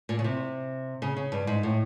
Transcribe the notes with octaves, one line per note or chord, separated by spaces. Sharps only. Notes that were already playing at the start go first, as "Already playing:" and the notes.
A#2
C#3
C3
C#3
C#3
G2
G#2
A2